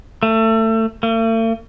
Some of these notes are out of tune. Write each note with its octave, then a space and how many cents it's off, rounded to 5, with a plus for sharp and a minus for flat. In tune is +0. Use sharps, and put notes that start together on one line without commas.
A3 +25
A3 +45